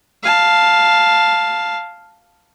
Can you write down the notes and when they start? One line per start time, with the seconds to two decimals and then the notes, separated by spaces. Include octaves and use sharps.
0.23 F5 A5